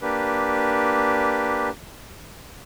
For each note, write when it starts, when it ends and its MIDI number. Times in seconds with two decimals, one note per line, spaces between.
0.01 1.70 58
0.01 1.70 62
0.01 1.70 67
0.01 1.70 71